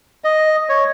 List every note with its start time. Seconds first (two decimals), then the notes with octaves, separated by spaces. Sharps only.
0.24 D#5
0.69 C#5